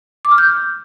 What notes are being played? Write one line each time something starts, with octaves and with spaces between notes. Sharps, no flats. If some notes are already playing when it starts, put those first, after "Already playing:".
D6
F6
G6